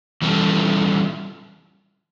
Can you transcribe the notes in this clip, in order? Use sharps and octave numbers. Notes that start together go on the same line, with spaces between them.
E3 G3 C#4 F4 A4